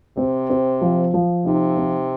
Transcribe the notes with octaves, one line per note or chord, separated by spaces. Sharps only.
C3 C4
C4
F3
F3
C3 D#4
C4